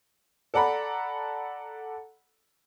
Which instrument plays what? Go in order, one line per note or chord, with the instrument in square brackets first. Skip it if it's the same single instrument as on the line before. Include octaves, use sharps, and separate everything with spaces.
[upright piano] A4 D5 F#5 A#5 B5